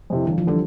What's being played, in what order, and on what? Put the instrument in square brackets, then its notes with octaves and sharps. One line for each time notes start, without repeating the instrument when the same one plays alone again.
[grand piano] F2 C3 E3
[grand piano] G1 [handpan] E3
[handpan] F3
[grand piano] D3 [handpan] G3